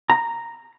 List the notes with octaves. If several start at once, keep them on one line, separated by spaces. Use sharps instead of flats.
A#5